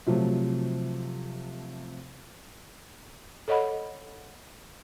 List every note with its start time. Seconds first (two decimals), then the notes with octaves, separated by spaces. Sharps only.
0.07 C3 F3 F#3 A3
3.48 A4 C#5 D#5 F#5 B5